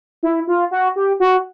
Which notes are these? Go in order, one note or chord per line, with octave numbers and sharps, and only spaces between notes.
E4
F4
F#4
G4
F#4